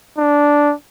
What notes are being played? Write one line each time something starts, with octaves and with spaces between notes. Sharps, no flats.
D4